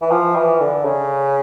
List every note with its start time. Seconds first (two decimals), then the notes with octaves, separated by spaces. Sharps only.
0.02 E3
0.11 F3
0.36 E3
0.60 D3
0.85 C#3